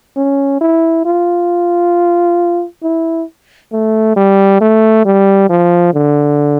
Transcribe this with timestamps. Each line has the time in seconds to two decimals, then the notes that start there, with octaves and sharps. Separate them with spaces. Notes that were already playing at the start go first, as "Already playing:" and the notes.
0.16 C#4
0.61 E4
1.05 F4
2.83 E4
3.72 A3
4.16 G3
4.61 A3
5.05 G3
5.49 F3
5.94 D3